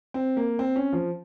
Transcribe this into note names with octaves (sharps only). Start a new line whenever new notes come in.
C4
A#3
C4
C#4
F3